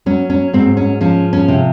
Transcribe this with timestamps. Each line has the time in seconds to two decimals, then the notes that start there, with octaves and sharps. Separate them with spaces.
0.06 F#3 C#4
0.30 C#4
0.53 G#2 C4
0.77 C#4
1.01 F3 C#4
1.33 C#4
1.48 C3